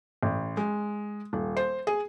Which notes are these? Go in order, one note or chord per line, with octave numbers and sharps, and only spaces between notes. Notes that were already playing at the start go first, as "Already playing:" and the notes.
A1
G#3
D#1
C5
G#4